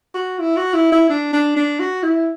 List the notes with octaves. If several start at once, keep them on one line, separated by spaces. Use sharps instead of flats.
F#4
E4
F#4
E4
E4
D4
D4
D4
F#4
E4